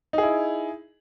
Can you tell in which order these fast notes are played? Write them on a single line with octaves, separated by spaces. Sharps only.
D#4 G#4 E4